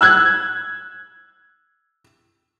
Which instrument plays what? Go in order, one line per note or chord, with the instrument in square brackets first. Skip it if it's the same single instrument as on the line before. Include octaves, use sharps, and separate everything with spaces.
[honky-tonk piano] E6 F#6 G#6